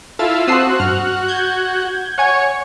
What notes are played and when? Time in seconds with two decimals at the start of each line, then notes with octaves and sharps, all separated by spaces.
0.19 E4 F4 A4 A6
0.48 C4 F#4 A4 C5 D#6 E6 C7
0.80 G2 F6
1.28 G6 G#6
2.18 C#5 F#5 G#5 G#6